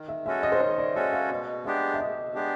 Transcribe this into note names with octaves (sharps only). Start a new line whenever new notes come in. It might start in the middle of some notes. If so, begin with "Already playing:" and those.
Already playing: D#3
E5
G#3 C#4 F#4 A4 E5
D#5
C5
D#3 C#5
D5
G#3 C#4 F#4 A4 D#5
F5
B2
G#3 B3 D4 G4 E5
E5
B2 D#5
G#3 B3 D4 G4